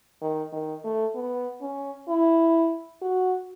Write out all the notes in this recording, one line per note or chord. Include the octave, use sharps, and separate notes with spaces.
D#3
D#3
A3
B3
C#4
E4
F#4